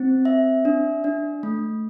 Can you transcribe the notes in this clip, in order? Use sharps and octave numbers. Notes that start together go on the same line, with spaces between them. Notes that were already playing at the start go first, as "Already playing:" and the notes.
Already playing: C4
E5
D4
D4
A3